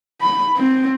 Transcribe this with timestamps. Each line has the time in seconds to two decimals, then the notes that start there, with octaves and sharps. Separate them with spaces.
0.21 B5
0.57 C4